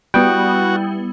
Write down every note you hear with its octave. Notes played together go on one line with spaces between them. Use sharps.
G3 B3 E4 F#4 G5